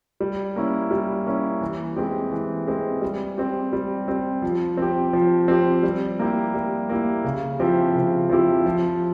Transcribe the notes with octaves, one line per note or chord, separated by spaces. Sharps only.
G3
A#3 C#4 E4
G3
A#3 C#4 E4
E3
G#3 C4 G4
E3
G#3 C4 G4
G3
C4 G4
G3
C4 G4
F3
C4 G4
F3
C4 G4
G3
A#3 E4 G4
G3
A#3 E4 G4
C#3
F3 C4 E4 G4
C#3
F3 C4 E4 G4
F3